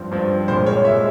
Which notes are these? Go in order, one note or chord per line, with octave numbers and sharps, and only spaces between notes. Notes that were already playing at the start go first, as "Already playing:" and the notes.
Already playing: G2 F3 C4
G2 F3 C4
C2 A#2 G#3 C5
C#5
C2 A#2 G#3 E5